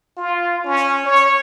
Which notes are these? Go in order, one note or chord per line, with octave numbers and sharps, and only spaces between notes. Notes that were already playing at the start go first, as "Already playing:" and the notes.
F4
C#4
C#5